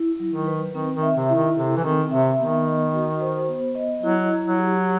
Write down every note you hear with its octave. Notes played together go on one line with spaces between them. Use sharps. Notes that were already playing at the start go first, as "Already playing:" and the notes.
Already playing: E4
F#3
D#3
B4
D#3 C4
D#3
E5
C3
E4
D#3
C3 A4
E3
D#3 C4
C3 E5
D#3 B3
D#5
F#4
C5
B3
D#5
F#3 E4
E4
F#3
G4